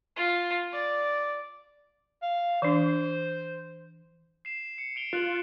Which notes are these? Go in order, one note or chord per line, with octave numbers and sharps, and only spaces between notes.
F4
D5
F5
E3 D4 C5
C7 E7
C#7
D7 F7 G7
F4 F#6 D7 F#7